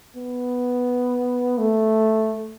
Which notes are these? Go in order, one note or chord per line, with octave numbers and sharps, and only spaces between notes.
B3
A3